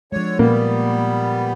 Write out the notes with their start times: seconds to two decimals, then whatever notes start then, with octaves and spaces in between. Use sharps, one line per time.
0.12 D3 F3 G#3 C#5
0.39 A#2 G3 A#3 B3